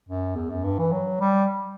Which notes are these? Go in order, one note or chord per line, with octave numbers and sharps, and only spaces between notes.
F#2
E2
F#2
G2
E3
F#3
G3